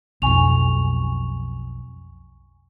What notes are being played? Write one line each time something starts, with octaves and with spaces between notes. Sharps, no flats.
B1 F2 G#5 C#6 F7